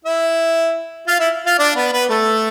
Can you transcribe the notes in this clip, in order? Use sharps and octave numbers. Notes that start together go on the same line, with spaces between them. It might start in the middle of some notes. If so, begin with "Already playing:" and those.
E4 E5
F4 F5
E4 E5
F4 F5
D4 D5
B3 B4
B3 B4
A3 A4